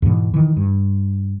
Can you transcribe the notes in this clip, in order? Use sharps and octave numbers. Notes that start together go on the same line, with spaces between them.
E2 G#2 B2 E3
D#3 E3
G2